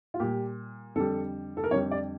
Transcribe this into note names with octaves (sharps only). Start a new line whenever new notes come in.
F4
A#2 G3 G4
F2 D3 G3 A4
A4
A#4
F2 D3 G3 C#5
D5